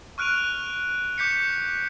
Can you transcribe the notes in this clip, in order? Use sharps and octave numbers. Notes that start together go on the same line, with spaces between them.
C#6 F6 F#6 D7 D#7 F7
D6 G6 B6 C#7